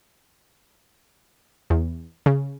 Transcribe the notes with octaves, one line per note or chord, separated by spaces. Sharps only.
E2
C#3